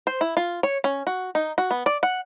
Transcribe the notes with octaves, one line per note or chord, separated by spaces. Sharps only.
C5
E4
F4
C#5
C#4
F#4
D#4
F#4
B3
D5
F#5